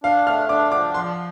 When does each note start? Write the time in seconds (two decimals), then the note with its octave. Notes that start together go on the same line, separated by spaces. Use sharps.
0.04 D4 F5
0.27 A3 F6
0.49 D4 D6
0.72 F3 D6
0.94 F3 C6